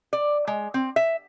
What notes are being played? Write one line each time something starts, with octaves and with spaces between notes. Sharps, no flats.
D5
G#3
C4
E5